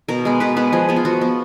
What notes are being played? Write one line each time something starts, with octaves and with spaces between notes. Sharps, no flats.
B2 A#4
G#3 B3
B2 B4
G#3 B3 B4
F3 G#4
G#3 B3
F4
F3 F#4
B3